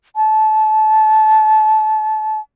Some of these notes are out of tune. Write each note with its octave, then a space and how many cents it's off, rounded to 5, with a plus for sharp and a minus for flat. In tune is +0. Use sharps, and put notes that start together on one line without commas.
A5 -25